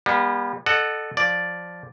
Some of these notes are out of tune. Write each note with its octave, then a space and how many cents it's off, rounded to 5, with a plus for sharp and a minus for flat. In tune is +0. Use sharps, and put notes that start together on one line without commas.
G3 +35 B3 -35
A4 +0 D#5 -40 F#5 +0
F3 +5 D5 +0